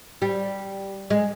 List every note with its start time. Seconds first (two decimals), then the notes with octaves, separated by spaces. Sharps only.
0.22 G3
1.10 G#3